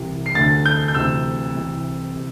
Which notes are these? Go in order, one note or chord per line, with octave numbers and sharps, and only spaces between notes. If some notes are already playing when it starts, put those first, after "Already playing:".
Already playing: C2 C3 E3
C7
D2 D3 A6
G6
G6
D2 C3 E3 E6
C2 C3 E3
C3